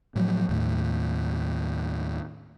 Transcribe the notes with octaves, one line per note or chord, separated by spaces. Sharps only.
A2 F3 F#3
D#2 A2